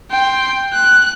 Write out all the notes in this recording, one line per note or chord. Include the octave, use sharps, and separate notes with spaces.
G5 C6
F#6